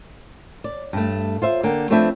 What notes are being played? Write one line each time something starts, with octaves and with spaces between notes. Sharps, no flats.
D5
G2 A3
F4 C5 E5
D3 A#3 G5
F3 A3 C4 D4 B4 E5